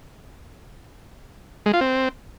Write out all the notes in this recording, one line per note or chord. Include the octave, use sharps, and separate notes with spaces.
G#3
F4
C4